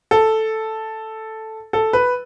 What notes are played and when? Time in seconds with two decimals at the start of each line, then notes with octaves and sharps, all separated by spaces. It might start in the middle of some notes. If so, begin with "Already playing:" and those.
0.11 A4
1.73 A4
1.93 B4